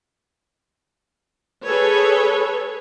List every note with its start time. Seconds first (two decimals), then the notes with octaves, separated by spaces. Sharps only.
1.66 G#4 A4 B4 C#5